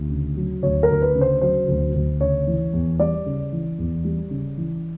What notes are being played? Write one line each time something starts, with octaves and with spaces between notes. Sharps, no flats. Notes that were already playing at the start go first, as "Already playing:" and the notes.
Already playing: D2
C#3
F#3
D2 C#5
A#4
D2
B4
C#3
C5
F#3 C5
D2
D2
C#3 C#5
E3
E2
G3 D5
C#3
E3
E2
G3
C#3
E3